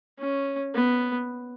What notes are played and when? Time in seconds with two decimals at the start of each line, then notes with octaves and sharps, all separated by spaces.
0.19 C#4
0.75 B3